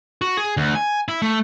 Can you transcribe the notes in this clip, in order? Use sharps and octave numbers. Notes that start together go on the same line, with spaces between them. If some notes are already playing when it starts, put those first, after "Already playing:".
F#4
G#4
D2
G#5
E4
A3